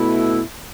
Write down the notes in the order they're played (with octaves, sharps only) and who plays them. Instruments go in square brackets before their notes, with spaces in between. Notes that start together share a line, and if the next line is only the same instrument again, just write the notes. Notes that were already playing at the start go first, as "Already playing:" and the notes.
Already playing: [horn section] B2 A3 E4